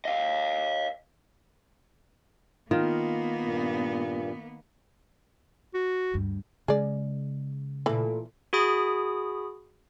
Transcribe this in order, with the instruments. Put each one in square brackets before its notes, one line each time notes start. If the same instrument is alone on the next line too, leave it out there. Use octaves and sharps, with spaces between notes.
[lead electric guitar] D#5 F5
[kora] D#3 [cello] A#3 B3 [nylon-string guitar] F4
[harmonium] G2 A#2
[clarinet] F#4
[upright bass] D2 G2
[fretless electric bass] C#3 G#3 [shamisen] G#4 D5
[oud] A#2 A4 [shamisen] E3 B5
[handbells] F#4 G#4 B5 D#6